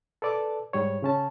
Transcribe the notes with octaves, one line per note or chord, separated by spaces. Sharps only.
A4 B4 D5 A5 D6
G#2 G3 C#5
C#3 C#4 A5